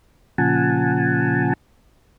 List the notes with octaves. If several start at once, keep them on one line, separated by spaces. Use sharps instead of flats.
A#2 C#3 F3 F#5 G#5 A5